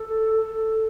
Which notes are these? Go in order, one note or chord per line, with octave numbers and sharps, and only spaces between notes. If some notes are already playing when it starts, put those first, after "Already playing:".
Already playing: A4
A4